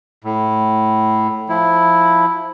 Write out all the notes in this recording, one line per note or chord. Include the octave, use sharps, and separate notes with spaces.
A2
F3 E4